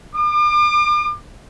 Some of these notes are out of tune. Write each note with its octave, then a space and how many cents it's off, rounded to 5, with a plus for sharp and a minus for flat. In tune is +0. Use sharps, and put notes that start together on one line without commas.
D6 +40